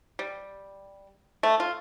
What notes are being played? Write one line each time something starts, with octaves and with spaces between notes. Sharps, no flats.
G3
A3
F4